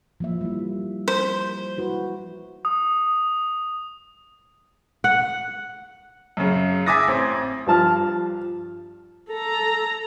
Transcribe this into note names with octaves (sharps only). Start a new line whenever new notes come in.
F3 A#3 E5
G3 A#3 E4
C5
E4 F#4 B4
D#6
F#5
F#2 C#3
E5 G#5 D6 D#6 A6 A#6
A1 C4
G2 F3 A5 F6
A4 A#5